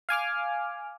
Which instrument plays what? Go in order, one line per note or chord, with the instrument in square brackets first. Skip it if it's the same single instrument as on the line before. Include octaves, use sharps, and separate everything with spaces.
[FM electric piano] F5 G#5 D6 F6